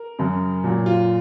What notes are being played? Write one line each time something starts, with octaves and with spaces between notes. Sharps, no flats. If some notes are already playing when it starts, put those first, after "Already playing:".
Already playing: A#4
F#2 C#3 F#3
A#2 F#3
F4